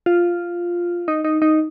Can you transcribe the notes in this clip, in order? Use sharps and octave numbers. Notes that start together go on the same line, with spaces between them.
F4
D#4
D#4
D#4